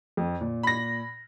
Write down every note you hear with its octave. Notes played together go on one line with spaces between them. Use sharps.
F2
A#2
B5 A#6